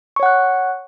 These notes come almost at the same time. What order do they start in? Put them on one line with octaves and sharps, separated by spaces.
C#6 C#5 F#5 F#6